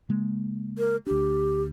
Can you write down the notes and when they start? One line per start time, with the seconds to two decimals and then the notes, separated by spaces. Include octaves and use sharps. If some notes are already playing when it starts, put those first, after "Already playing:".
0.09 C#3 G#3 A#3
0.78 A#4
1.06 D2 D4 G4